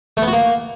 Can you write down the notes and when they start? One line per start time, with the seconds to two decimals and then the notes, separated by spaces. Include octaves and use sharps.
0.17 A3
0.22 B3
0.28 F#4
0.33 A#3